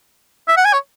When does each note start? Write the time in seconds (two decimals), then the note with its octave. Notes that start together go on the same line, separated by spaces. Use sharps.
0.48 E5
0.57 F#5
0.65 G#5
0.73 C#5